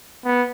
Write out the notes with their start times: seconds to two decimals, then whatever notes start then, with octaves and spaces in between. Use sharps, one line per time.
0.25 B3